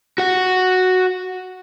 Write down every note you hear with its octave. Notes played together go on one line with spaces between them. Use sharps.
F#4 F#5